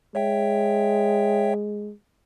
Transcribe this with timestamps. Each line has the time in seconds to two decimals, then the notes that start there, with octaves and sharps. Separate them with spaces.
0.15 G#3 C#5 E5 G5